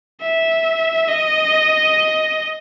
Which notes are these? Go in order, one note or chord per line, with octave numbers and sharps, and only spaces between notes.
E5
D#5